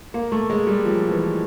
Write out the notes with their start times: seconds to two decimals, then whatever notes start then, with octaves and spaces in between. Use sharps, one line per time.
0.14 A#3
0.32 A3
0.50 G#3
0.67 G3
0.85 F3
1.09 E3